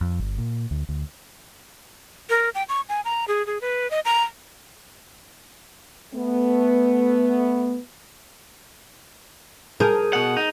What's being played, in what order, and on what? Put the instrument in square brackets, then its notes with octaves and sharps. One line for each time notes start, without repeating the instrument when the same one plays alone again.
[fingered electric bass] F2
G1
A#2
D2
D2
[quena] A#4
G5
C#6
G#5
A#5
G#4
G#4
B4
D#5
A#5
[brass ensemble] A3 B3
[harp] G#4 G6 D#7 [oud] A#4
[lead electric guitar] B2 F#5
D#4